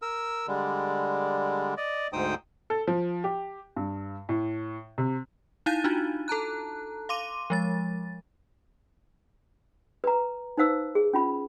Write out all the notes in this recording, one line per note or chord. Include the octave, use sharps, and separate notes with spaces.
A#4 E6
D3 G3 G#3
D5 D#5
D2 G#2 D#4 C5 G5 D#6
A4
F3
G4
G2
A2
C3
D#4 E4 F5 G6 A6 D#7
D4 D#4 F4 F#4
A4 A5 A#5 F#6
F5 C6 D6 D#7
F3 G#3 A6
B4 A#5
D#4 B4 C5 F5 E6
G#4
C#4 F4 B5